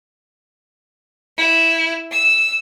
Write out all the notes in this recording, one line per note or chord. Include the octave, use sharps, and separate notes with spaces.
E4
E6